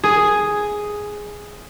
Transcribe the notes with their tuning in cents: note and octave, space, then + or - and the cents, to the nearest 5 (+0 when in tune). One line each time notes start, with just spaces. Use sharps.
G#4 +0